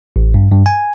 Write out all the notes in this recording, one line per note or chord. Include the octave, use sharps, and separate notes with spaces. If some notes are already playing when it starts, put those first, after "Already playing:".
A1
G2
G2
G#5